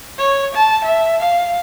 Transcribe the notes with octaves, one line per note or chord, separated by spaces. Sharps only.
C#5
A5
E5
F5